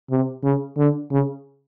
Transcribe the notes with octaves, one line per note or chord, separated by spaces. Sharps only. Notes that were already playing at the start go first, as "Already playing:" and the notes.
C3
C#3
D3
C#3